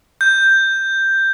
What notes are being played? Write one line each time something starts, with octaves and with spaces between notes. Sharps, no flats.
G6